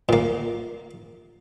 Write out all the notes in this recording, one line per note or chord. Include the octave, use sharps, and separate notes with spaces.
A#2 A#3